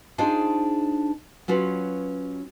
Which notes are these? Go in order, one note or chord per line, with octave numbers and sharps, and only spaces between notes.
D4 D#4 F4 G#4 C5
F#3 C#4 F4 B4